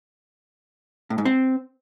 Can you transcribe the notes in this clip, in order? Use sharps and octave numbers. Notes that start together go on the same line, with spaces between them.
A2
G#2
C4